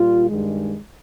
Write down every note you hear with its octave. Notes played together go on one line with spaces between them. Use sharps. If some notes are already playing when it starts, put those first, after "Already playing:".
Already playing: A#2 G3 F4
G2 D#3 G#3